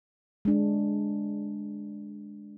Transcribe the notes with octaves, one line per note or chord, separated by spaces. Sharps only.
G#3 D4